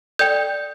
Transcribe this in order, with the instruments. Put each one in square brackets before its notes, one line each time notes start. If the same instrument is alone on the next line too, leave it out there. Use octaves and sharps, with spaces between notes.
[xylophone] A4 D5 G5 G6